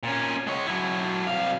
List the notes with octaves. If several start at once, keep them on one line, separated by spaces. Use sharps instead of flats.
A#2 C#4
G#3 C#5
F#3 E4
C2 F5